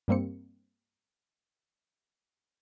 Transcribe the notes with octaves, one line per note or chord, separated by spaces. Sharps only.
G2 G3 A#3 C4 C#7